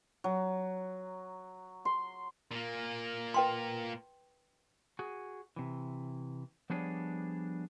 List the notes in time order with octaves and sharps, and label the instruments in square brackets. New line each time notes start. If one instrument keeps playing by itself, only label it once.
[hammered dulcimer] F#3
C6
[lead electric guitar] A#2 A#3
[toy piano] B4 G5 C6
[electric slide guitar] F#4 G#4
C3 E3
F3 G3 B3 D4 G#4 C#5